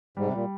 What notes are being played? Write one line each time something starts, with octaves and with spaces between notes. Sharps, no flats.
G#2 G3
C3
A#2 G3